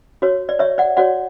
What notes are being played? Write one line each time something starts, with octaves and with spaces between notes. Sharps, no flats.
F#4 C#5
D5
C#5 E5
D5 F#5
F#4 C#5 D5 F#5